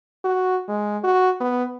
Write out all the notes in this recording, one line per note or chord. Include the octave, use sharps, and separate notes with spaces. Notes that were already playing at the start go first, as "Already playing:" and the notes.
F#4
G#3
F#4
B3